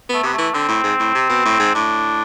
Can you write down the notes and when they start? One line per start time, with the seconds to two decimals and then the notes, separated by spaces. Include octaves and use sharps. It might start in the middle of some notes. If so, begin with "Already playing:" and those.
0.09 A3 B3
0.23 C3 B3
0.33 E3 A3
0.54 D3 C4
0.68 A2
0.84 G#2
1.00 A2
1.15 C3
1.30 B2
1.45 A2
1.59 G#2
1.75 A2 D4